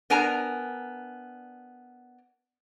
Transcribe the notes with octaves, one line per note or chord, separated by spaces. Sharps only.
B3 D4 A#4 G#5 A#5